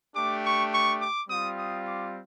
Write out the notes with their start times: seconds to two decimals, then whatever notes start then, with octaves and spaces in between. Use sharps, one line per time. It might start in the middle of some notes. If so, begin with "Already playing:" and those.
0.15 A3 D4 G4 D6
0.44 C#6
0.72 C#6
1.01 D6
1.29 G3 C4 F4 D#6
1.57 D#6
1.86 D6